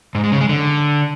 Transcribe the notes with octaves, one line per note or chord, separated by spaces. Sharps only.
G#2
G#3
C#3
G#3
D3